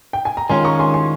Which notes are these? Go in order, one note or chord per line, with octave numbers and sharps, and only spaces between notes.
G5
G#5
A#5
D#3 G#3 C#4 F4 G#5 C6
A#5 C#6
G#5 C6
G#5 C6